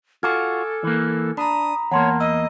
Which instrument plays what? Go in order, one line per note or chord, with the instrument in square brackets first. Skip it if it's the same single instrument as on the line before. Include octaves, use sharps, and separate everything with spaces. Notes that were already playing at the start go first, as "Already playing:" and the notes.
[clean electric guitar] F4 F#4 [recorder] A4 [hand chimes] G#5 D6 G#6 [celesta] F6
[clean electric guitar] E3 A#3
[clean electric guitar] D4 [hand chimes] A#5 B5 [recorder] D#6
[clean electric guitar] E2 A#3 [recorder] C#5 [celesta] F#5 A5 C6
[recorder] D#5 [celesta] E6